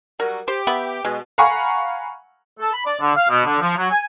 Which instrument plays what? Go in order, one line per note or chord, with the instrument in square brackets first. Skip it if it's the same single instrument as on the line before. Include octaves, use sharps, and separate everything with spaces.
[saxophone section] F#3 G3 F#4 [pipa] A#4
[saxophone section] G4 [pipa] C5
[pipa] B3 E5 B5
[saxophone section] B2 [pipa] G#3
[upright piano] F5 F#5 G#5 A#5 B5 C#6
[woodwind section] A4
B5
D5
D3
F5
B2
D3
F3
F#3
G#5